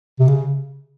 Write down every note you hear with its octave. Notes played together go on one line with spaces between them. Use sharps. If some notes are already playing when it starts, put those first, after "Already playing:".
C3
C#3